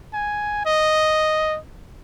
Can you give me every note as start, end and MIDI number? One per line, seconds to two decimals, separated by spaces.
0.13 0.62 80
0.65 1.59 75